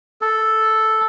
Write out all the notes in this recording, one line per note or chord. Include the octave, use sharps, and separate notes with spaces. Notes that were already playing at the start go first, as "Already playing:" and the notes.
A4